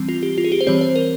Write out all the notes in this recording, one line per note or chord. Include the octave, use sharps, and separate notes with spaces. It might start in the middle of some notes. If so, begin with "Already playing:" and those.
Already playing: E3 G3 C4
F4
G4
F4
G#4
G4
C5
E3 G3 C4 C#5
C5
A#4